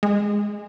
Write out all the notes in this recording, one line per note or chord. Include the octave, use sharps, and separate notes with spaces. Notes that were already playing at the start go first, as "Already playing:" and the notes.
G#3